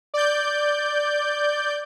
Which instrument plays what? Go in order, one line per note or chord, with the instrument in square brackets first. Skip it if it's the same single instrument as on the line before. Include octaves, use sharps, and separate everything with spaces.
[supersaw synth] D5 G6